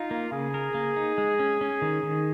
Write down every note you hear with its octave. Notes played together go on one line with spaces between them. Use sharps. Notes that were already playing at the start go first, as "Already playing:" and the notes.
Already playing: D#4 F4
A#3
C#3 G#4
A#4
A#3
D#4
G#3
C#4
C#4
D#3
D#3